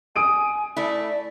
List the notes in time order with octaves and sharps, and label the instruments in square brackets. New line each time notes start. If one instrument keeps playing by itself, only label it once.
[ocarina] G#5 [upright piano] D#6 D7 D#7
[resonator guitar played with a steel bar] A3 E4 [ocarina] D5